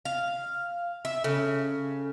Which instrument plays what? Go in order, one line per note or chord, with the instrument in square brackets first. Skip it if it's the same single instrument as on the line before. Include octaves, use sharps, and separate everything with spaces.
[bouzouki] F5
E5
[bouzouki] C#3 [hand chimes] C#4 A4